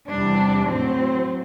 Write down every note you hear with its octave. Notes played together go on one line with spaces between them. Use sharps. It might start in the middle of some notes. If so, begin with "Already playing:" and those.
E2 C3 E3 G3 D4
A2 F#3 C4